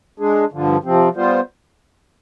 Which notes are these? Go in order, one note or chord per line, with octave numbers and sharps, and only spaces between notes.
G#3 D4 G#4
G2 D3 F3
C3 F3 C4
G3 B3 F4 C5